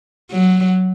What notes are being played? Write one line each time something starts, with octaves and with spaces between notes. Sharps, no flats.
F#3